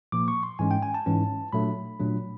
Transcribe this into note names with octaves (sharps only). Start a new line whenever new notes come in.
A#2 F3 A#3 D6
C#6
C6
G#2 E3 G#3 C#4 G#5
G5
G#5
A5
G#2 E3 G#3 C#4
A#2 F#3 A3 D4 B5
A#2 F#3 A3 D4